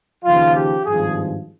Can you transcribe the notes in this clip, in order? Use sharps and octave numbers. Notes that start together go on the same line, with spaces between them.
D#2 C#3 F3 F4
G4
G#1 G2 F3 G#4